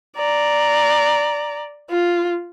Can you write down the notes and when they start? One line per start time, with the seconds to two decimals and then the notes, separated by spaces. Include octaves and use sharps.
0.16 D5 A#5
1.90 F4